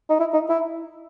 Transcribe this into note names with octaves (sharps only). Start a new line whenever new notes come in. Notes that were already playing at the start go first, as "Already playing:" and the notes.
D#4
E4
D#4
E4